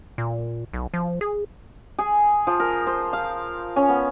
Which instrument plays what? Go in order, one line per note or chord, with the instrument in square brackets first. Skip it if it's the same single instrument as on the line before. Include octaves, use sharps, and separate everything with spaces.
[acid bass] A#2
B1
F3
G#4
[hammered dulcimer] G#4
F3
A#4
C5
F5
C#4
B3